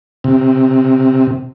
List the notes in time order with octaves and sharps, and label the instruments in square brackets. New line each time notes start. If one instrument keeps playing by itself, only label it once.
[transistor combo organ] C3